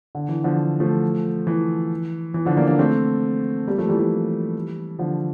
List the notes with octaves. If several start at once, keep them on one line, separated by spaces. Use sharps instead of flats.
D3
E3
D3 F3
F3 A3
E3
E3
D3 F3
A#3 D4
A#3 D4
A3 C4
G3 A#3
F3 A3
E3 G3
E3 G3
D3 F3